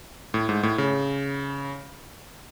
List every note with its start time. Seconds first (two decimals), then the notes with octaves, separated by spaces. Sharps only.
0.34 A2
0.49 G#2
0.63 A2
0.78 C#3